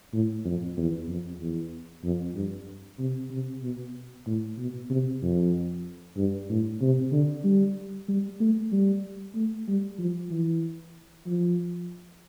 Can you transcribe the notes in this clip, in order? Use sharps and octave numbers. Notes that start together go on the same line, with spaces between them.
A2
F2
E2
F2
E2
F2
G2
C3
C3
B2
A2
B2
C3
F2
G2
A2
C3
D3
G3
G3
A3
G3
A3
G3
F3
E3
F3